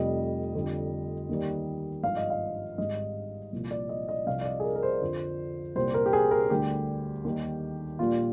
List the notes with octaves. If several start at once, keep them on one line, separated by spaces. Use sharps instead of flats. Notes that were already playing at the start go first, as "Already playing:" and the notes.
Already playing: F1 F2 C3 G3 D#5
F2 D3 G3
D#2 D#3 G3
G#1 G2 F3 F5
D#5
F5
G#1 G#2 G3 D#5
C2 A#2 F3
D5
D#5
D#5
C2 C3 F3 F5
D5
D#5
G#4
A#4
A#4
C5
F2 D3 F3
C2 A#2 G3 C5
A#4
G4
G#4
A#4
D2 D3 G3 G4
D#2 D#3 G3
A#1 A#2 G3 F4